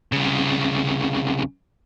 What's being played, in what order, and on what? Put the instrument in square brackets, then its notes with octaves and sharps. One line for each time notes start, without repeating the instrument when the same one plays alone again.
[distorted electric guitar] C2 C#3